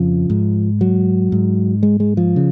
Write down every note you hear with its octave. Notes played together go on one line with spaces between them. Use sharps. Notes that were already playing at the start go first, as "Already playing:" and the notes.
Already playing: F2 C#3 F3
G#2
F#3
G#2
G#3
G#3
F3
C#3